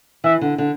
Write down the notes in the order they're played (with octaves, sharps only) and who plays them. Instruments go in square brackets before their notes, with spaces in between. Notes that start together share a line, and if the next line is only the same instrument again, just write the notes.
[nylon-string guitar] E3 [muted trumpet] E5
[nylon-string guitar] D3
D3